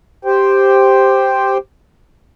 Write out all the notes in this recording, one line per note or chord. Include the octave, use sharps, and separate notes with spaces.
G4 C5 G5